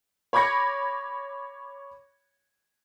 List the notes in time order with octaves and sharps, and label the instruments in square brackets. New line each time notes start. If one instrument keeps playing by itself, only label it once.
[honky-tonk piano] C#5 B5 D6 G#6 A#6 C#7